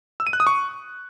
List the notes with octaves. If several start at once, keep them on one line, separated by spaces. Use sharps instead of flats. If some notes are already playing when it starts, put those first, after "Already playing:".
E6
D#7
F#6
D#6
C#6